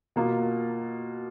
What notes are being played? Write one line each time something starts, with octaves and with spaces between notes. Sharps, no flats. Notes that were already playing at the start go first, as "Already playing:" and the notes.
B2 A#3 F4